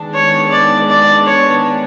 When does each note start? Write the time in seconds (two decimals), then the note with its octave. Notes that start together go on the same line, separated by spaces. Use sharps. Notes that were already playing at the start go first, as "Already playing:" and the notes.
Already playing: D#3 G#3 B3 D4
0.14 C#5
0.52 D5
0.90 D5
1.26 C#5